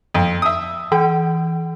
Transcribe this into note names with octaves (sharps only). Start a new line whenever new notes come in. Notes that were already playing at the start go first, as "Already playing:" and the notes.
F2
E5 D#6
E3 G5